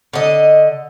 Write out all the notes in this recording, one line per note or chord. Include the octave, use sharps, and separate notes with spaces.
D3 D#5